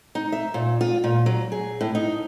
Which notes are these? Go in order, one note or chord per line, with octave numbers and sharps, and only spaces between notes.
D#4
E5
A#2
F4
A#2
F#3
G#4
A2
D#4